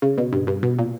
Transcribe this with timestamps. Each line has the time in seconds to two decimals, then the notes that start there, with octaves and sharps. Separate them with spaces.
0.02 C#3
0.18 B2
0.33 G2
0.47 G2
0.63 B2
0.78 A#2